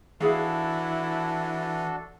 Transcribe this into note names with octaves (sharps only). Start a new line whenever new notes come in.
E3 D4 E4 F#4 G#4 A4 F5